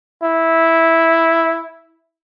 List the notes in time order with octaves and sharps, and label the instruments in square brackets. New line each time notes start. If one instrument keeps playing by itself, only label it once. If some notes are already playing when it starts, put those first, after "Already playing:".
[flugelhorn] E4